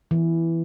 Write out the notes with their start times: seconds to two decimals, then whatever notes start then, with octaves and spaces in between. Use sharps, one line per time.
0.11 E3